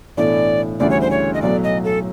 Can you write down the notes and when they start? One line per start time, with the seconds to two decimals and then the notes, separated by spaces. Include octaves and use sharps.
0.17 B1 A2 E3 A3 D4 D5
0.80 D2 C#3 E3 G3 D5
0.90 C#5
1.01 C5
1.11 C#5
1.34 D#5
1.42 B1 A2 F#3 D5
1.64 D#5
1.84 A4